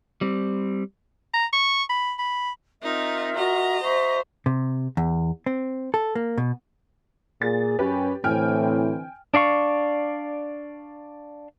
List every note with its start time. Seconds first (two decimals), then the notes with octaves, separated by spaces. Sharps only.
0.21 G3 C4
1.34 A#5
1.53 C#6
1.89 B5
2.19 B5
2.83 C4 D#4 F4 A#4 E5
3.36 F#4 D#5 A#5
3.83 C5 E5 C#6
4.46 C3
4.97 E2
5.46 C4
5.94 A4
6.15 A#3
6.38 B2
7.42 A#2 G#4 A6
7.79 F#2 C#4 G4 B4
8.24 A2 D3 E3 C4 G5 G#5 F6
9.34 D4 D5 F5 C#6